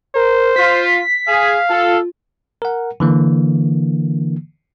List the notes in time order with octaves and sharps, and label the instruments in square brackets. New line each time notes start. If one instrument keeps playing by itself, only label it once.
[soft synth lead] A#4 [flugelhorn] C5
[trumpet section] F4 [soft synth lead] B6
[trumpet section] G#4 [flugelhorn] F5
[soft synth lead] F4 [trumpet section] A4
[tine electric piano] A#4 F#5
D3 E3 A#3